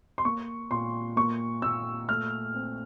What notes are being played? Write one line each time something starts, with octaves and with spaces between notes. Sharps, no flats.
C6
A#3 C#6
A#2 C6
A#3 C#6
A#2 E6
A3 F6
C4